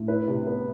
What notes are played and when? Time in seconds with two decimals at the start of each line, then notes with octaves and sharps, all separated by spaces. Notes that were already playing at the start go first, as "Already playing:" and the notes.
Already playing: A2
0.08 E4 B4
0.28 C3
0.47 B3